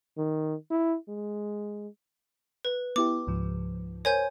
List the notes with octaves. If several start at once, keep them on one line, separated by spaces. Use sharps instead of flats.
D#3
E4
G#3
B4
B3 E4 G4 D6
C#2 G#2 F3
A#4 C5 C#5 G#5 G6